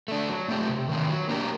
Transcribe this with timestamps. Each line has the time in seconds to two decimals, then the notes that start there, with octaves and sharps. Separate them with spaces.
0.08 A3 D4
0.29 F#3
0.48 A3 C4 G4
0.69 C3
0.89 D#3 F#3 C4
1.09 F#3
1.29 A#3 D4 G4 A#4